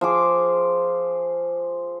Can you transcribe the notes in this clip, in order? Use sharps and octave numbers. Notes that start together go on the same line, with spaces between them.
F3 G#4 D6